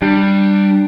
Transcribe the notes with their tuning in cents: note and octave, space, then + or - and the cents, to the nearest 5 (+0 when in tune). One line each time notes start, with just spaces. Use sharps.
G3 +0 D4 +25